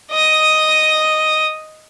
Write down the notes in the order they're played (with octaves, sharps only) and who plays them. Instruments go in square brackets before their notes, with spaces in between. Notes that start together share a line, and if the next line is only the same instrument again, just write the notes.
[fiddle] D#5 D#6